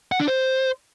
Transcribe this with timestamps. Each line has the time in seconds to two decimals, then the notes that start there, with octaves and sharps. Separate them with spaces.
0.12 F#5
0.20 D4
0.28 C5